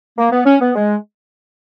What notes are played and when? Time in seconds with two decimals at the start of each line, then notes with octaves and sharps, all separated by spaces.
0.17 A#3
0.31 B3
0.46 C#4
0.60 B3
0.75 G#3